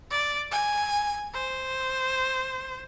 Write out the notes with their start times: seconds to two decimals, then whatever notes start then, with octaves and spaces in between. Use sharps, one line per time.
0.11 D5
0.52 G#5
1.34 C5